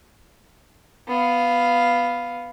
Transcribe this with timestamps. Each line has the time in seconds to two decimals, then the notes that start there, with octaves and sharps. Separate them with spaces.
1.08 B3 F5